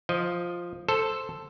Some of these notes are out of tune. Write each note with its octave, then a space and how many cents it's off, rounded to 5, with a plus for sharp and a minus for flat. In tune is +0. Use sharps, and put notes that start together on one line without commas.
F3 +0 D#5 +5
A4 +0 C5 +0